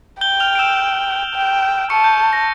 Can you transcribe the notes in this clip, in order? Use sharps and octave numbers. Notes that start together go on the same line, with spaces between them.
G5 G6 G7
F6 F7
D7
E6 E7
G5
A5 C#6 C#7
G6
A#6